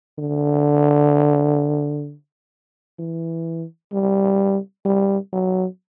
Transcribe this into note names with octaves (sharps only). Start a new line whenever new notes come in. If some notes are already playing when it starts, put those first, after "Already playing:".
D3
E3
G3
G3
F#3